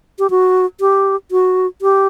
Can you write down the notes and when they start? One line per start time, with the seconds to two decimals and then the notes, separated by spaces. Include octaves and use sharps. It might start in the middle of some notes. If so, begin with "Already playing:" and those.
0.19 G4
0.30 F#4
0.80 G4
1.31 F#4
1.82 G4